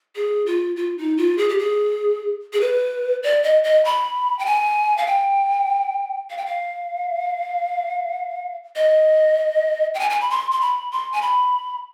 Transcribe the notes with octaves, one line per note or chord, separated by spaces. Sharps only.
G#4
F4
F4
D#4
F4
G#4
G4
G#4
G#4
B4
D5
D#5
D#5
B5
G5
G#5
F5
G5
F5
G5
F5
D#5
G5
G#5
G#5
B5
C6
C6
B5
C6
G#5
B5